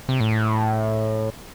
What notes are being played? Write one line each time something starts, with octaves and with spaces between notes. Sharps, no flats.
C3
A2